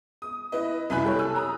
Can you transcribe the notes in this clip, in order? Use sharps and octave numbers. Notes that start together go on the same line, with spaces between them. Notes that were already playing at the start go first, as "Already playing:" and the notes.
D#6
E4 B4 D#5
C2 F#2 E4 G#5 B5 F#6
G4 A4 C#5
G#5 E6 F#6
A#5 D#6